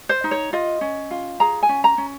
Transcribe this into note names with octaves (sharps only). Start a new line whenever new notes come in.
C5
D#4
C#5
F4 D#5
C#4
F4
G#4 A#5
G#5
C#4
A#5
C#4